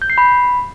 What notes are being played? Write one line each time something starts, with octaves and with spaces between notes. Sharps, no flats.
G6
C7
B5